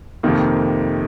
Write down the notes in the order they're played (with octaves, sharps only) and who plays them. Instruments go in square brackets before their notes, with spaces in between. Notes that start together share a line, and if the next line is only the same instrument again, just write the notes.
[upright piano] F2 C3 D#3 A#3